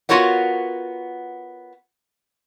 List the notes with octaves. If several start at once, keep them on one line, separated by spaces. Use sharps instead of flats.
B3 F4 F#4 A#4 C#5 F#5